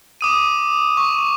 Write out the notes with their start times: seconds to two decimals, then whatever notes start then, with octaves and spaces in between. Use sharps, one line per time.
0.21 D6 D#6 D#7
0.97 C#6